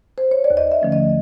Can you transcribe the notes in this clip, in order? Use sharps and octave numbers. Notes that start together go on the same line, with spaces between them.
C5
C#5
D5
D#2
D#5
E5
D3 F3 A3 C#4
D#5